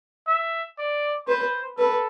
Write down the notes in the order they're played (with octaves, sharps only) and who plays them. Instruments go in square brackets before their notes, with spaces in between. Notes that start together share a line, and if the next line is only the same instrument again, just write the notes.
[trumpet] E5
D5
[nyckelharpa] B4 [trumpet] C5
[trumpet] A4 [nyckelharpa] B4